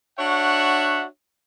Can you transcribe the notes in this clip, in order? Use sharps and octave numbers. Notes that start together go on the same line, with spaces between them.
D4 F#4 C#5 E5 F#5